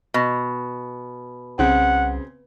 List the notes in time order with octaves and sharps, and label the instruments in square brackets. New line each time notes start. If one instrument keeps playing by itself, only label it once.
[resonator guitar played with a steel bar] B2
[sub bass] C2 [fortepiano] C#3 C4 [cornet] F#5